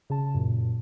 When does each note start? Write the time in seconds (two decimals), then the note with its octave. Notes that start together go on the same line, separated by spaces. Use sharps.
0.10 C#3 A5
0.34 F#2 A#2